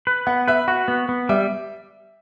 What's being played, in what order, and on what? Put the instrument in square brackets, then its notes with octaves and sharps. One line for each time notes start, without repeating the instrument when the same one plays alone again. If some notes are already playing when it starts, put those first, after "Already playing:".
[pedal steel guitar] B4
[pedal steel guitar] B3 [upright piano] F#5
[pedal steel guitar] B4 [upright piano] E5
[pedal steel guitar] F#4 [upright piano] F#5
[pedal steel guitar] B3
B3
[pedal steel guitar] G3 [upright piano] E5